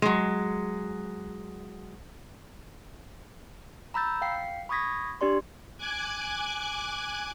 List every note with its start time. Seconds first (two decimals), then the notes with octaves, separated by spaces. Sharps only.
0.02 F#3 G#3
3.94 A#5 B5 E6 G6 A6
4.21 F5 G5 C7
4.69 B5 C#6 D#6 G#6 A#6 B6
5.21 D4 G4 D5 C6
5.78 G#5 D6 F#6 G#6